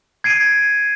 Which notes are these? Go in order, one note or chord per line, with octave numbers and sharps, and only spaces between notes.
G#6 C7 D7 D#7